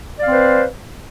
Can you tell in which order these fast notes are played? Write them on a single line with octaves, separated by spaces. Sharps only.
D5 F5 C4 B4 C5